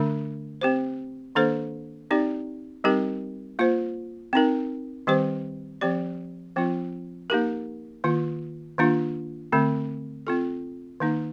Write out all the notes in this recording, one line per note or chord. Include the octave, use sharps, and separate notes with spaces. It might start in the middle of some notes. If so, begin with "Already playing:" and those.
Already playing: D3 A3 D4
C4 G4 C5
D#3 A#3 D4 A4 C5
C4 D#4 G4 D5
G3 C4 D#4 G4 A#4
A#3 F4 C5
C4 D#4 A#4
D#3 G3 C4 G4 C5
F3 C4 G4 D5
F3 C4 F4
A#3 D#4 G4 A#4
D#3 A#3 F4
D#3 A#3 D4 F4
D3 A3 C4
C4 F4 A4
D#3 A#3 D#4